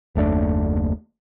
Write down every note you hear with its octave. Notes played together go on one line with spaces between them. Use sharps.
F#1 D#2 A3 D4